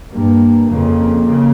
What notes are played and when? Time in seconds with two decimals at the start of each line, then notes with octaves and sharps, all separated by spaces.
0.12 G2 A#3
0.67 F2 C#3 A#3
1.23 C#3